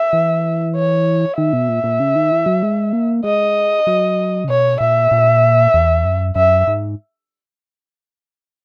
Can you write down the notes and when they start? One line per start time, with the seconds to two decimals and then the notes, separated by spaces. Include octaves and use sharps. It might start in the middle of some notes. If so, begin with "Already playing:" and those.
Already playing: E5
0.13 E3
0.75 C#5
1.38 D#3 E5
1.53 B2
1.69 A#2
1.84 A#2
2.00 C#3
2.16 D#3
2.31 E3
2.46 F#3
2.63 G#3
2.93 A#3
3.24 G#3 D#5
3.87 F#3
4.44 C#3
4.49 B2 C#5
4.80 A#2 E5
5.11 A#2
5.74 E2
6.05 F#2
6.35 F#2 E5
6.67 G#2